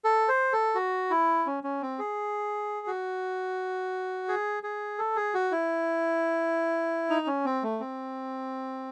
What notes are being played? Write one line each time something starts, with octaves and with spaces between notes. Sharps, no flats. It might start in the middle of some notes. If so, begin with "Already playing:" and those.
A4
C5
A4
F#4
E4
C#4
C#4
C4
G#4
F#4
G#4
G#4
A4
G#4
F#4
E4
D#4
C#4
C4
A3
C4